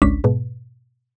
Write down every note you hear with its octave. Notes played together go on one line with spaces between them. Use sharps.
G#1 C#2 C#4 D4 B6
G#2 B2